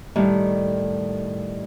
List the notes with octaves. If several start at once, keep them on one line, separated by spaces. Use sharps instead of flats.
A2 D#3 G3